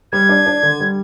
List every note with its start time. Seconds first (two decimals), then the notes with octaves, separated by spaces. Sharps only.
0.12 G3 G#6
0.29 D4
0.46 D4
0.63 D3
0.80 G3